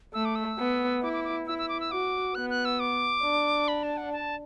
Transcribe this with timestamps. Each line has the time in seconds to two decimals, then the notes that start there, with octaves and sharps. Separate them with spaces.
0.14 A3 E6
0.25 D6
0.36 E6
0.58 B3
1.03 E4 D6
1.13 D6
1.24 D6
1.47 E4 E6
1.58 E6
1.69 D6
1.80 E6
1.91 F#4 D6
2.35 B3 F#6
2.50 F#6
2.65 E6
2.80 D6
3.23 D4
3.68 B5
3.83 A5
3.97 F#5
4.13 A5